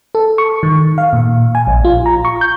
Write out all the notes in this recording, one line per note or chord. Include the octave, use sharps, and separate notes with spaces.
A4
C#6
D#3
F5
A#2
G#5
A#1
F4
A#5
C#6
G6